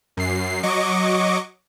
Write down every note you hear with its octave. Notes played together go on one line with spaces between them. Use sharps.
F#2 C7
F#3 D#5 C#6 D6